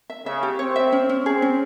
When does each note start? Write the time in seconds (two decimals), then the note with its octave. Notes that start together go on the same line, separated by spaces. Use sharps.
0.10 E5
0.26 C#3 E5
0.43 G4
0.59 C4 C#5
0.76 E5
0.93 C#4
1.09 C#4
1.25 C4 G#4
1.42 C#4